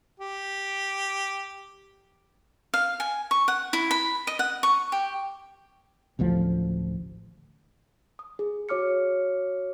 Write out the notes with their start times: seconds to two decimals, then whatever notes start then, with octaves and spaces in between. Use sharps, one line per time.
0.20 G4
2.74 F5
3.00 G#5
3.31 C#6
3.48 F#5
3.73 E4
3.91 B5
4.27 D#5
4.39 F#5
4.63 C#6
4.92 G4
6.19 D1 A1 D2 F3
8.19 D#6
8.39 G#4
8.69 F#4 C#5 D6 F6 C#7